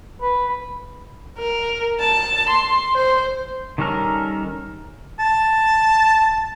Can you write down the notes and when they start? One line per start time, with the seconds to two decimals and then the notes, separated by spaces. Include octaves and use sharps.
0.21 B4
1.39 A#4
2.00 A5
2.50 C6
2.94 C5
3.78 D#3 G3 C#4 A4 A#4
5.19 A5